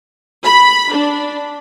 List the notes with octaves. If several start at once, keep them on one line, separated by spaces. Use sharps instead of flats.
B5
D4